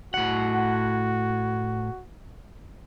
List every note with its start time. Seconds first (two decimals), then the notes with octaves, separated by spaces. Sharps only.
0.14 A2 F#4 F#5